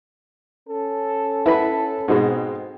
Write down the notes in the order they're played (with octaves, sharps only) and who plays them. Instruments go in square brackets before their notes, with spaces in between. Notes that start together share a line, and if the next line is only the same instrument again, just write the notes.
[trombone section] C#4 A4
[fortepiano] E4 B4 B5
[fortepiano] G#2 B2 G#3 [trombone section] C4